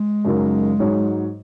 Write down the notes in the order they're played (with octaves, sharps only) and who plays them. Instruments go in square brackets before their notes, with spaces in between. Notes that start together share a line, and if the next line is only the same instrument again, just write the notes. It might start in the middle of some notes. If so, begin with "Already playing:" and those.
Already playing: [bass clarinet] G#3
[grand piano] F#2 C#3 F#3 D#4 A#4
G#2 F#3 D#4 G#4 C#5